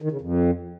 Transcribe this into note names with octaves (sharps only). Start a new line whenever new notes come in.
D#3
C#3
F2